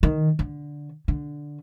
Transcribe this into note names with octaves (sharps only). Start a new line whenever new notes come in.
D#3
D3
D3